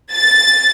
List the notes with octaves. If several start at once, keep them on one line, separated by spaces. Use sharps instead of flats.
A6